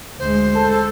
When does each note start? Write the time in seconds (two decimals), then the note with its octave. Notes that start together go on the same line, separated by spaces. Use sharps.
0.19 D2 G#3 C5
0.55 A4